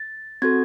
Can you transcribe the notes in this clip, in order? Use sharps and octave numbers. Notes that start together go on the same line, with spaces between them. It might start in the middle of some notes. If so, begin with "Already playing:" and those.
Already playing: A6
C4 F#4 A4 G#6